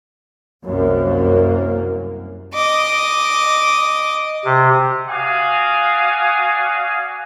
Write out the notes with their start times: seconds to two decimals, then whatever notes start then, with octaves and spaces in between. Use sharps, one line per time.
0.65 C2 F#2 A#3
2.54 D#5 D6
4.45 C3
5.10 F#4 D5 F5 G#5 D#6